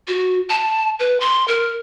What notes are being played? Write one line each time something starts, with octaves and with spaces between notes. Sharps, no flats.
F#4
A5
B4
C6
A#4